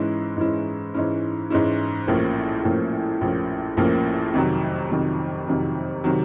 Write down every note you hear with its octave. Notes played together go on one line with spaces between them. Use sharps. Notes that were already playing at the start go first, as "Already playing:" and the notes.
Already playing: G#2 E3 G#3 C#4 E4
G#2 E3 G#3 C#4 E4
G#2 E3 G#3 C#4 E4
G#2 E3 G#3 C#4 E4
A#1 A2 F3 A#3 C#4
A#1 A2 F3 A#3 C#4
A#1 A2 F3 A#3 C#4
A#1 A2 F3 A#3 C#4
F2 C3 D#3 F#3
F2 C3 D#3 F#3
F2 C3 D#3 F#3
C3 D#3 F#3